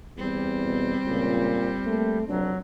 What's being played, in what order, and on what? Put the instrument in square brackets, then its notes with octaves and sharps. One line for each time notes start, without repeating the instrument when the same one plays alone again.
[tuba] E2 [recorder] G3 [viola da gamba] C4
[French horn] B2
[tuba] C#2 [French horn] A#2
[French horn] A3 [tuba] A#3
[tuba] F1 [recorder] F#3 [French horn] D4